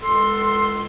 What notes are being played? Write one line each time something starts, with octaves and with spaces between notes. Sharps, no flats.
C#2 A4 C6